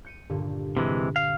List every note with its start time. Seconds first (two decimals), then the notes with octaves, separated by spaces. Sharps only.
0.05 G6 C#7 D#7
0.30 G2 A#2 D3
0.77 C3 E3 G#3
1.16 F5